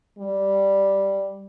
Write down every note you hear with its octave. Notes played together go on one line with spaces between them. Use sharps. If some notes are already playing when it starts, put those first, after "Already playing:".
G3